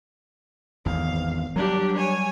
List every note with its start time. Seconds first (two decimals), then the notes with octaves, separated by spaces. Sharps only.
0.86 G#1 E2 F5
1.56 F#3 G3 D4 G4
1.97 C#5 G#5